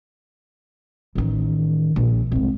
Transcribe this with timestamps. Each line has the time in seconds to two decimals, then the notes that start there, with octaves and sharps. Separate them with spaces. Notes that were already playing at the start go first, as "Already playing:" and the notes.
1.15 A1 D#3
1.96 A#1
2.32 C2 G#2